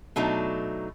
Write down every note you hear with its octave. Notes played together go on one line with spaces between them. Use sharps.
B2 F#3 A3 D4 D#4